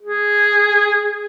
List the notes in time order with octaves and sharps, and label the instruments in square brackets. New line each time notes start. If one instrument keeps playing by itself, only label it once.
[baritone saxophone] G#4